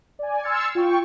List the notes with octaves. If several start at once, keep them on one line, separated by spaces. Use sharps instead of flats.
D5 G#5
C6 E6 F6 G#6 A6 C#7
F4 G5 C#6